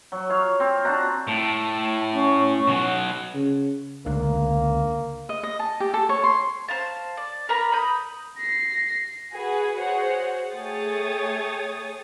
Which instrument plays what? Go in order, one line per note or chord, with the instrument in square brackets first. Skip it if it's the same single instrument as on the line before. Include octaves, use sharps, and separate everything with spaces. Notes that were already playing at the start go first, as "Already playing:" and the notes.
[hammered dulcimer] F#3
C#5 F5
C4
D4 F#4 F#5 A#5
[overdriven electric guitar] A2 [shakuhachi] A5
[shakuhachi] C#4
[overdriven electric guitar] B2 F#3
[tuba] C#3
[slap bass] C#2 D3 D4 [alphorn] A#3
[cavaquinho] D#5
D#5
A5
G4
A4
C#5
C6
[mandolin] C5 F5 A5
D5
A#4 B4 A#5 B5
B5 D#6 G6
[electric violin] A#6 C7
[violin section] F#4 G#4 B4 G#5
F#4 G#4 C5 C#5 F#5
A3 G#4 C#5 G5 D#6 A6